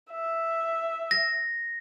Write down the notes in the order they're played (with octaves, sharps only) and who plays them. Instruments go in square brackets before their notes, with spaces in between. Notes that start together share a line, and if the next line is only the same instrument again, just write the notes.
[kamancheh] E5
[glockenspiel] A#6